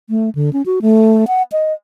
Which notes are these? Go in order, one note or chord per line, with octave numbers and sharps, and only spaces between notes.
A3
D3
C#4
F#4
A3
F#5
D#5